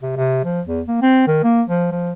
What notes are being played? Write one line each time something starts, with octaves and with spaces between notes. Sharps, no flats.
C3
C3
F3
E2
A#3
C4
D#3
A#3
F3
F3